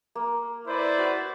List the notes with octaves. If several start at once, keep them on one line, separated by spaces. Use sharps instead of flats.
A#3
E4 B4 C5 D5
F#4